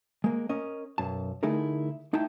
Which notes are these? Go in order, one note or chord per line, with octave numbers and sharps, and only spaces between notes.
G#3 A#3
C#4 A#4 D#5
B1 F#2 A5
D3 A3 D#4 E4 G#4 A#4
A3 D#4 E4 G5 A5